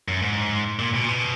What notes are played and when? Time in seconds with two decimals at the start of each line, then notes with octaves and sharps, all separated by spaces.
0.08 F#2
0.22 G#2
0.79 A#2
0.94 B2
1.03 A#2
1.08 B2